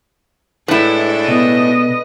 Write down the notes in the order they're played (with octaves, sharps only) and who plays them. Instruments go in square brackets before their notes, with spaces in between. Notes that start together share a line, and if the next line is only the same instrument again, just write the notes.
[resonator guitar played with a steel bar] A2 E4 [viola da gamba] G#3 D4 A4 [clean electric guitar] B4
[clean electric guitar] B2 [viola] B4 D#5